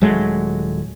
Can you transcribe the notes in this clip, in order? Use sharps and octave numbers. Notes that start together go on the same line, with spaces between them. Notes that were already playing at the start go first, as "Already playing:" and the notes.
D#1 F#3 G#3 A3